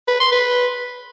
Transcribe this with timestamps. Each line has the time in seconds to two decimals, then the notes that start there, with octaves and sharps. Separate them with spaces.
0.08 B4
0.20 C6
0.32 B4